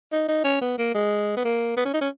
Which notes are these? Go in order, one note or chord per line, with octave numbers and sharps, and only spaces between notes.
D#4
D#4
C#4
B3
A#3
G#3
B3
A#3
B3
C#4
D#4
C#4